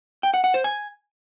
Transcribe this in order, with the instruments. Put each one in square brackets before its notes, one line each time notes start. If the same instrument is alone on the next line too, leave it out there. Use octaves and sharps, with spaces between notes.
[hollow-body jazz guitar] G5
F#5
F#5
C5
G#5